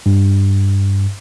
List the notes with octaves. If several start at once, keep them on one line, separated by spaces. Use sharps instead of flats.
G2